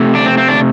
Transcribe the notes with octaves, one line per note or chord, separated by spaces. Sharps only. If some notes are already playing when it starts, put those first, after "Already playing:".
Already playing: C3 A3
D4
C4
C4
D4